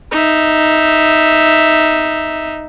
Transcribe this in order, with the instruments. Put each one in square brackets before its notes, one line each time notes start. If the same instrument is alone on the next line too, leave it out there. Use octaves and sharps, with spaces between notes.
[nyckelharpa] D#4 E5